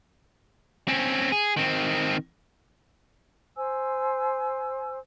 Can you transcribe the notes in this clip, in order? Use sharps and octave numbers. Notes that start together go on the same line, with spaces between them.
C4 C#4
G#4
D#3 C4
C5 G#5 E6